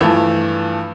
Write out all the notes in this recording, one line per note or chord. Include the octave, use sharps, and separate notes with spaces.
G2 E3 F3 A3